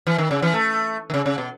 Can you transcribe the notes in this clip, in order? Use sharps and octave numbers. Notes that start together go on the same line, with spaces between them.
E3
D#3
C#3
E3
A3
D#3
C#3
C#3
B2